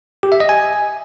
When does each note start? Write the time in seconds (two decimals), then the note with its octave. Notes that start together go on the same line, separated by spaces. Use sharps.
0.23 G4
0.32 E5
0.40 D#5
0.49 G#5